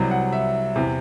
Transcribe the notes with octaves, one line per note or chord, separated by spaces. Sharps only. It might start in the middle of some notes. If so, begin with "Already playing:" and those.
Already playing: C2 C3 F#3
F#5
E5
E2 C3 E3